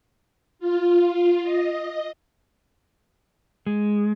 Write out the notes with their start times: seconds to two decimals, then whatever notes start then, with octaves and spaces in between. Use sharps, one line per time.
0.59 F4
1.43 D#5
3.66 G#3